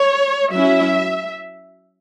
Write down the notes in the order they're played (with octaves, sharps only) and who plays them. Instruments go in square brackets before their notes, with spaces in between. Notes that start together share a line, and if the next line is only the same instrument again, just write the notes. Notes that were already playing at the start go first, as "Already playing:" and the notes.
Already playing: [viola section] C#5
F#3 C#4 E4 E5